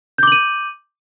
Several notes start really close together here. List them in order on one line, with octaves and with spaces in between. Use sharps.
G6 D6 F#7 D#7